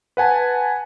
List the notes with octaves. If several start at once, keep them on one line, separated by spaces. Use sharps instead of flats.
B4 F#5 G#5 A5